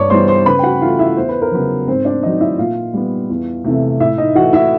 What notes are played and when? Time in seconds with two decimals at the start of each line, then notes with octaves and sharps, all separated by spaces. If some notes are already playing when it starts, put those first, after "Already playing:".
Already playing: G2 C#5 D5 C#6
0.10 E3 G3 B3 C5 C6
0.28 C5 C6
0.46 C#3 B4 B5
0.59 G5
0.63 F#4 F#5
0.81 E3 A3 F4 F5
0.99 E4 E5
1.17 E2 C5
1.29 B4
1.42 A#4
1.52 C#3 F#3 B3 B4
1.87 G#2 C4 C5
2.05 D4 D5
2.23 D#3 F#3 D#4 D#5
2.41 E4 E5
2.58 A#2 F4 F5
2.93 G3 B3
3.30 E2
3.64 C3 E3 A3
4.00 A2 E4 E5
4.18 D#4 D#5
4.35 E3 A3 F#4 F#5
4.53 E4 E5